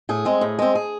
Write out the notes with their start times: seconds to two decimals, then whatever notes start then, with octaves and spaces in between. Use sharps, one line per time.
0.09 A2 G#4
0.25 G#3 C4
0.41 A2
0.59 G#3 C4
0.75 G#4